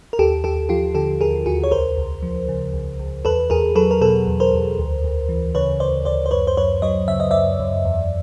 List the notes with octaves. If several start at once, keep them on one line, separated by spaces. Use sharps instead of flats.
A#4
D#2 G4 A4
D#2 G4 A4
F3 F4 G4
D3 G4 A4
D#2 G#4 A#4
D#2 F#4 G#4
C#5
C#2 A#4 C5
C#2
F3
C#3
C#2
C#2
E2 A4 B4
E2 G#4 A#4
F#3 A4 B4
A#4
B2 A4 B4
E2
A#4 C5
E2
D2
D2
E3
C#3 B4 C#5
D2 C5 D5
D2 C5 D5
C5
F#2 B4 C#5
C5
F#2 B4 C#5
F#3 C#5 D#5
C#3 E5
D#5
F#2 D5 E5
F#2
E2